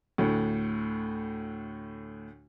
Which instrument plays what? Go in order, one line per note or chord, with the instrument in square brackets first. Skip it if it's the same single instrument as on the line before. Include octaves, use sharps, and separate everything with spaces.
[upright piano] D2 A2